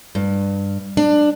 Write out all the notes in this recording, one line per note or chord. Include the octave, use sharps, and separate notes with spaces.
G2
D4